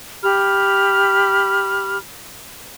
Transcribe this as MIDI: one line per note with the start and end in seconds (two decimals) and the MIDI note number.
0.22 1.98 67
0.22 1.98 83
0.22 1.98 89